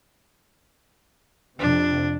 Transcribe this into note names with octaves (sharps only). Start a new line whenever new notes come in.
F2 C3 D4